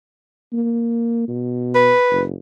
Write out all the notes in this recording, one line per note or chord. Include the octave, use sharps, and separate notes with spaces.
A#3
B2
B4
F#1